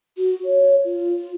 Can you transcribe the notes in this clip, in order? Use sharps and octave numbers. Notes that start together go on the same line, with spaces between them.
F#4
C#5
F4